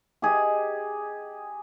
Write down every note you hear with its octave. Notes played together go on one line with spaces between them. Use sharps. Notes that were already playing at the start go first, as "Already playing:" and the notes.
G4 G#4 D#5